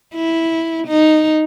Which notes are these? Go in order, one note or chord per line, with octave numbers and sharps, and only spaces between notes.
E4
D#4